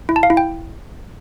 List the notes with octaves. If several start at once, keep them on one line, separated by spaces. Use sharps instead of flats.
E4
A5
F5
E4
G5